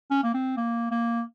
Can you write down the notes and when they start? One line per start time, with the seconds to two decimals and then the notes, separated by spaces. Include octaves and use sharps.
0.11 C#4
0.23 A#3
0.34 C4
0.57 A#3
0.91 A#3